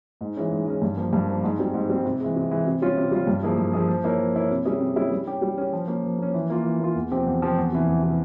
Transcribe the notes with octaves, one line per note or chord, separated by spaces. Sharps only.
G#2
E3 G#3 C#4
G#2
E3 G#3 C#4
G2
F3 A#3
G2
F3 A#3
G#2
G3 C4
G#2
G3 C4
C3
E3 G#3
C3
E3 G#3
C3
G3 C#4 F4
C3
G3 C#4 F4
G2
F3 A#3 E4 G#4
G2
F3 A#3 E4 G#4
F3
A#3 E4 A#4 C#5
F3
A#3 E4 A#4 C#5
C3
G3 C#4 E4 G#4
C3
G3 C#4 E4 G#4
G3
C#4 G4
G3
C#4 G4
F3
A#3 C#4
F3
A#3 C#4
E3
A#3 F4
E3
A#3 F4
E2
C3 F3 C4 G4
E2
C3 F3 C4 G4
E2
C3 E3
E2
C3 E3